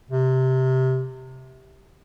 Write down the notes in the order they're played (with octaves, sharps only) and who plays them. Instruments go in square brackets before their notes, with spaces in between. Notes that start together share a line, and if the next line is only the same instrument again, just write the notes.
[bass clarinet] C3